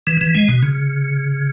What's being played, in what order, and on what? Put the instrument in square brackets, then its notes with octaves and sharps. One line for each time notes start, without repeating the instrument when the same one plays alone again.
[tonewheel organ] E3
E3
G#3
B2
C#3